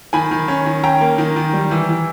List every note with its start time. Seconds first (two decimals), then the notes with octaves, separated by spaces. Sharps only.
0.13 D#3 G#5 B5
0.31 D#3
0.48 C#4
0.66 D#3
0.83 C#4 G5 A#5
1.01 A#3
1.18 D#3
1.36 D#3
1.53 G3
1.71 E3
1.89 E3